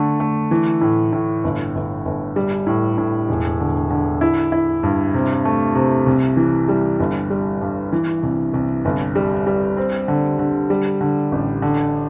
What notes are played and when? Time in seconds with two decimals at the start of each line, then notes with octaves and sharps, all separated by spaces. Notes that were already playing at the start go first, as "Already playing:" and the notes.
Already playing: D3 A3
0.20 A3
0.51 E3
0.81 A2
1.13 A2
1.44 G1
1.75 G1
2.05 G1
2.36 G3
2.67 A2
2.98 A2
3.29 E1
3.60 D3
3.90 D3
4.21 E4
4.52 E4
4.83 G2
5.14 C3
5.45 A3
5.75 C3
6.06 C2
6.37 E3
6.68 G3
7.00 G1
7.30 G3
7.61 G2
7.93 E3
8.23 C2
8.54 C2
8.85 G1
9.16 G3
9.47 G3
9.77 C4
10.08 D3
10.39 D3
10.70 G3
11.01 D3
11.32 A1
11.62 D3